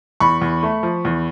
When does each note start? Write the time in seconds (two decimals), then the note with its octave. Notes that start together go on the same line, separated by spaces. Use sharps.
0.20 E2 B5 C#6
0.41 E2
0.63 A3
0.83 F3
1.05 E2